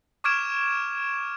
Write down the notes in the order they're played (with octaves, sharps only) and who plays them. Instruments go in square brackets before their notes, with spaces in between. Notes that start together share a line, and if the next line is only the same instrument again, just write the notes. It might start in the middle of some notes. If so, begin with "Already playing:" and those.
[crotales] C#6 D6 F6 G#6 D7 E7